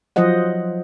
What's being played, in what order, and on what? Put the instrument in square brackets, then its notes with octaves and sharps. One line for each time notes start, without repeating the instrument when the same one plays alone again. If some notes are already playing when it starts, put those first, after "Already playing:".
[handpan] F3 F#3 F4 C5 D#5 F#5